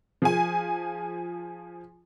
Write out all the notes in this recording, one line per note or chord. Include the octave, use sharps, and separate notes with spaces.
F3 G#4 G#5